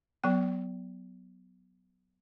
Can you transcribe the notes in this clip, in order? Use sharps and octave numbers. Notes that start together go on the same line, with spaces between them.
F#3 B3 G5